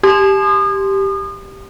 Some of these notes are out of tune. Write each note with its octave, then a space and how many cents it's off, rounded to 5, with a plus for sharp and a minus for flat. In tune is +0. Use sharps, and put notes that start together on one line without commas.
G4 +0 C6 +0 D#6 -35